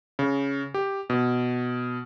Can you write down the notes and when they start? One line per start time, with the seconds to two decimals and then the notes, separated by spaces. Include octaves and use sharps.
0.19 C#3
0.74 G4
1.10 B2